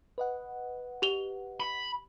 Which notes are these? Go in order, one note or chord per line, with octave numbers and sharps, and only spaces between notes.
B4 D#5 F#5
G4 F7 G7
B5